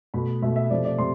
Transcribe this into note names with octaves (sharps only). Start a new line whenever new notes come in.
B2 A3 B5
B2 A3 E5
E5
C3 F3 A3 D5
D5
C3 C6